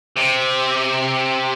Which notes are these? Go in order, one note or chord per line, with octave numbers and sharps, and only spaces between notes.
C3